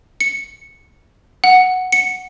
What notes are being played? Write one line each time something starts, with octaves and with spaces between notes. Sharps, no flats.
C#7
F#5
C#7